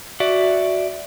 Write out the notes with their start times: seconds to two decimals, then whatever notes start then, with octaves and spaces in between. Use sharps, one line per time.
0.20 F#4 D5 E5